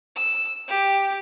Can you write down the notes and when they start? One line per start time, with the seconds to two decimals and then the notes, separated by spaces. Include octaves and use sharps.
0.16 E6
0.68 G4